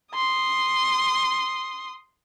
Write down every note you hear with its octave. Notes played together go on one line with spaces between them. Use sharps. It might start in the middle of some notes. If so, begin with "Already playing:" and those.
C6 D#6